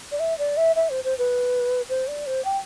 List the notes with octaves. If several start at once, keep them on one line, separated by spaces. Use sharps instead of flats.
D5
E5
D5
E5
E5
C5
C5
B4
C5
D5
C5
G5